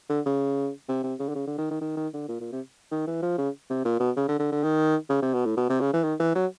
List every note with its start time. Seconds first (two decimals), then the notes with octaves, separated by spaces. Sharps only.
0.09 D3
0.25 C#3
0.88 C3
1.03 C3
1.19 C#3
1.29 D3
1.35 C#3
1.47 D3
1.58 D#3
1.71 D#3
1.81 D#3
1.97 D#3
2.13 D3
2.28 A#2
2.40 A#2
2.52 C3
2.92 D#3
3.07 E3
3.22 F3
3.38 C#3
3.70 C3
3.85 A#2
4.00 B2
4.16 C#3
4.28 D3
4.39 D3
4.52 D3
4.63 D#3
5.10 C#3
5.22 C3
5.34 B2
5.45 A2
5.57 B2
5.69 C3
5.81 C#3
5.93 E3
6.04 D#3
6.20 E3
6.35 F#3